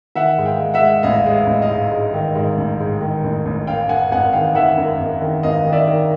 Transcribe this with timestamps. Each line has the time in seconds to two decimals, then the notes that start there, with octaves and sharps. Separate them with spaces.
0.15 D#3 E5 F#5
0.38 G#2
0.45 F5 G5
0.60 G#3
0.74 E5 F#5
0.82 G#3
1.03 A1 D#5 F5
1.26 G#3
1.33 D#5 F5
1.47 A1
1.62 D#5 F5
1.70 G#2
1.91 G#2
2.14 D#3
2.35 G#2
2.58 A1
2.80 G#2
3.01 D#3
3.24 A1
3.45 A1
3.67 F#2 F5 G5
3.89 F#2 F#5 G#5
4.11 G#1 F#5 G#5
4.33 D#3 F5 G5
4.55 D#3 E5 F#5
4.77 F#2
5.00 G#1
5.21 D#3
5.43 G#1 D#5 F5
5.66 D#3
5.72 D5 E5
5.88 D#3